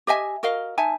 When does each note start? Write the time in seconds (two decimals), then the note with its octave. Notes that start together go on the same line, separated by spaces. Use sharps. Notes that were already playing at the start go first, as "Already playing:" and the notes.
0.07 G4 D#5 E5 G#5
0.43 F#4 A#4 D#5 F5
0.78 D#4 E5 G#5 A5